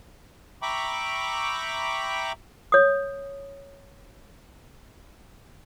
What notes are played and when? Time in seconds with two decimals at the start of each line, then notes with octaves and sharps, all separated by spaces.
0.62 E5 G5 A#5 B5 C#6 D6
2.72 C#5 D#6